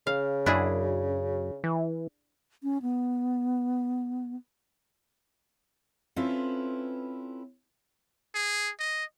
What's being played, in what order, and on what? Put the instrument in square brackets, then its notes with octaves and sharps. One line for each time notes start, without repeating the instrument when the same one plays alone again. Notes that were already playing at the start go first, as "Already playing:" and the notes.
[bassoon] C#3 [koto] F5
[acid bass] F#2 [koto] D4 E4 G#4
[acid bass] E3
[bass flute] C#4
B3
[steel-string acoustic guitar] C4 C#4 E4 F4 A4 B4
[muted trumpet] G#4
D#5